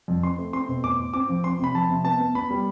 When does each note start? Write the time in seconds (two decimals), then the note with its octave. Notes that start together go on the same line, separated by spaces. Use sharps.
0.08 F2
0.23 C4 C6
0.38 A3
0.53 C4 C6
0.69 B2
0.84 A2 D6
0.99 A2
1.14 C4 D6
1.29 F3
1.44 C4 C6
1.59 C3 B5
1.74 F3 A5
1.89 C3
2.05 B3 A5
2.20 B3
2.35 B3 B5
2.51 G3